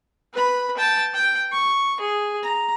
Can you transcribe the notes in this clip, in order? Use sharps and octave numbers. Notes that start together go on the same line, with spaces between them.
B4 B5
G5 A5
G5
C#6
G#4
A#5